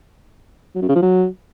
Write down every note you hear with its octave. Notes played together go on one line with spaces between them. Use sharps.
F#3
F#2
C#3
F3
F#3